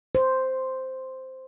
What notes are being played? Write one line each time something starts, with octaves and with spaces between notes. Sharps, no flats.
C5